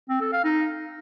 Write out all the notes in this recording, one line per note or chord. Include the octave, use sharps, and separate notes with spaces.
C4
A4
F5
D#4